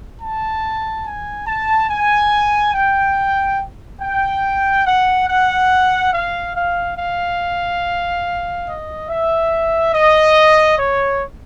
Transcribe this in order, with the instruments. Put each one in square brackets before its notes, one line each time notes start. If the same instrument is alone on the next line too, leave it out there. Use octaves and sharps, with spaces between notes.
[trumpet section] A5
G#5
A5
G#5
G5
G5
F#5
F#5
F5
F5
F5
D#5
E5
D#5
C#5